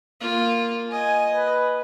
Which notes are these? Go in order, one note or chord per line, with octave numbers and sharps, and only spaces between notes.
A#3 F4
D#5 G#5
B4